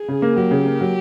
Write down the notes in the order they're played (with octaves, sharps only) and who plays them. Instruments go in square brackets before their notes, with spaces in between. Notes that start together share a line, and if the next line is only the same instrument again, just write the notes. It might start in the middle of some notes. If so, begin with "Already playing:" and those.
Already playing: [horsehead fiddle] G#4
[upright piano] C#3
A#3
[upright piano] F#3 [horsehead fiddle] G4
[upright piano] C#3
A#3
F#3